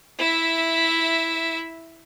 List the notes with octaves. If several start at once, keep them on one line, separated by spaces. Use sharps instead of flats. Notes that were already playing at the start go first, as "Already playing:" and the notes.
E4 E5